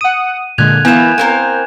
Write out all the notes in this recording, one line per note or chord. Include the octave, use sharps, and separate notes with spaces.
F#5 D#6 D#7
A#2 D3 G#3 F#6 G#6 F7
E3 A#3 B3 G#5 G6 E7
A#3 C4 A#4